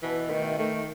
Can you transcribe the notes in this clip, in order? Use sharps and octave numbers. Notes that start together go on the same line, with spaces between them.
B2 E3
D#3 A3
D#3 A3